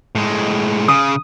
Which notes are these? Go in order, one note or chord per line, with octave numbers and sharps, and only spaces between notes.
A2 G#3
C#3 D#6